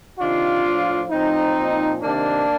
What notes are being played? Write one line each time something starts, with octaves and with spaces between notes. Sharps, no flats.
C3 D#3 D4 F4
A2 F3
A2 F3 C4 D#4
A#2 F3
C3 D#3 A#3 D4